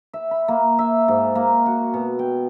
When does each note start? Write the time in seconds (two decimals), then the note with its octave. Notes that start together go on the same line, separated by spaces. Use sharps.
0.13 E5
0.31 B5
0.48 A#3
0.79 E5
1.08 G#2
1.35 A#3
1.66 F#4
1.94 B2
2.19 G5